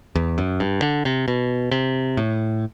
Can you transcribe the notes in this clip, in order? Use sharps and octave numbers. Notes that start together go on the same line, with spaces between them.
E2
F#2
G2
D3
C3
B2
C3
A2